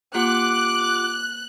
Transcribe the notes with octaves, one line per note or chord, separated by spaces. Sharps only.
A#3 F4 G4 F#5 D6 F#6